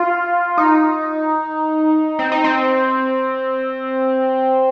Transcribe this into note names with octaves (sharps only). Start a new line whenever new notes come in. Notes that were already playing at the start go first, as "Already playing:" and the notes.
Already playing: F4
D#4
C4
D#4
C4